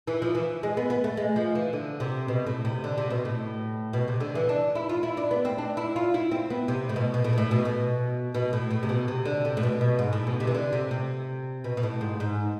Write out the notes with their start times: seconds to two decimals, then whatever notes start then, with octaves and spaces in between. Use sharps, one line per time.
0.07 E3
0.22 F3
0.35 E3
0.63 G#3
0.77 B3
0.90 B3
1.04 A3
1.17 G#3
1.36 F3
1.55 E3
1.73 D3
2.00 C3
2.28 B2
2.47 A2
2.65 C3
2.84 D3
2.98 C3
3.10 B2
3.25 A2
3.93 B2
4.08 C3
4.20 D3
4.35 E3
4.49 D4
4.75 E4
4.89 F4
5.03 E4
5.17 D4
5.31 B3
5.45 C4
5.58 D4
5.77 E4
5.96 F4
6.14 E4
6.31 C4
6.50 B3
6.68 C3
6.89 A2
6.96 B2
7.14 B2
7.24 A2
7.33 B2
7.38 A2
7.51 B2
7.65 B2
8.34 B2
8.53 A2
8.71 A2
8.83 C3
8.89 B2
9.08 C3
9.25 D3
9.45 C3
9.57 A2
9.63 B2
9.81 B2
9.99 G#2
10.13 A2
10.27 B2
10.40 C3
10.47 E3
10.55 D3
10.73 C3
10.91 C3
11.64 B2
11.77 B2
11.83 A2
12.01 G#2
12.20 G#2